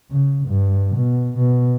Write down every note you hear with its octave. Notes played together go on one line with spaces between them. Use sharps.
C#3
G2
B2
B2